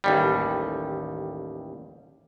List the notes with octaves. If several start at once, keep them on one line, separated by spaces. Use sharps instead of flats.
A1 D#2 G3